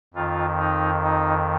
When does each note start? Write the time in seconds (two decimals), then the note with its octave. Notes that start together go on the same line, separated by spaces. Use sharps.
0.14 F2 D#3 F4
0.59 D#4
1.03 D#4